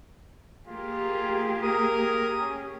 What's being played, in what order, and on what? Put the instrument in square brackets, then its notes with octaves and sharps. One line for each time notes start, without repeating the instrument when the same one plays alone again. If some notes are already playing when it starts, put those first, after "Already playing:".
[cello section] A#3 G4 G#4 [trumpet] F4
[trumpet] A#4 [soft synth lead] D#6
[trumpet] C#4